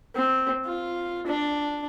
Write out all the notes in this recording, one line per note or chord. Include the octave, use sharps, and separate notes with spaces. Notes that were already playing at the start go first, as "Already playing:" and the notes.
C4
F4
D4